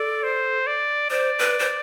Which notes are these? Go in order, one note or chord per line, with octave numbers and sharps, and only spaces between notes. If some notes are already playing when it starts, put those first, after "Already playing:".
Already playing: A4 D5
C5
D5
C5 D5
B4
C5